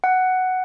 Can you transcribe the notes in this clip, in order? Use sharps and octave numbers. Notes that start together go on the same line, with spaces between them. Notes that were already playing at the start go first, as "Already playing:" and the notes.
F#5